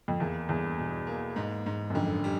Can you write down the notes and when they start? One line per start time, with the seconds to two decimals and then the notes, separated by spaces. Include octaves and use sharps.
0.08 F2
0.20 E2 A#3
0.49 E2 G2
0.78 B2
1.07 A#3
1.36 G#2
1.66 G#2
1.90 F#2
1.95 F2 D3
2.24 G3